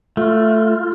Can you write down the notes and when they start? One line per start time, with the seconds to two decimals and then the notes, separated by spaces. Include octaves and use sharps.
0.17 A3 F4